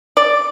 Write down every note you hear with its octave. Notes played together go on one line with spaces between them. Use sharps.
D5